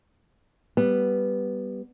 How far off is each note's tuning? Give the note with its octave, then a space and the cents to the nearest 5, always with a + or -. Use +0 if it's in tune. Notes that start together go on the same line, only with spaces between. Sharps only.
G3 +0 B3 +0